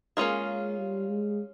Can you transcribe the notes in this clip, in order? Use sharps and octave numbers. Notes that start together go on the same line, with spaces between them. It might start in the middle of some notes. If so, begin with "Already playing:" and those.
G#3 A#3 C#4 F4 G#4
G3
G#3